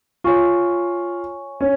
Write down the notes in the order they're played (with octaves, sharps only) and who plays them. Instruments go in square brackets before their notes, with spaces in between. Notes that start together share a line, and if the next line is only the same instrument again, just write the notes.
[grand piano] F4 [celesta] C#5 G#5 C#6
[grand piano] C#4